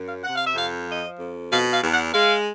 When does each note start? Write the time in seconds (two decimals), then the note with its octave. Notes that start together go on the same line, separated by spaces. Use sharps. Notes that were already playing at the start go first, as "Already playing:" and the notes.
Already playing: F#2
0.08 F5
0.24 C3 F#5
0.35 F5
0.46 E5
0.56 F2 F5
0.87 F3 D#5
1.19 F2
1.50 B2 F5
1.72 F5
1.82 E2
1.92 F#5
2.14 G#3 F5